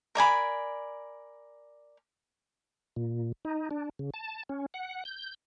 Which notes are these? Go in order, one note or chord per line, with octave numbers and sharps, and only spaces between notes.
A#4 D5 G#5 B5
A#2
D#4
D4
C#3
A5
C#4
F#5
G6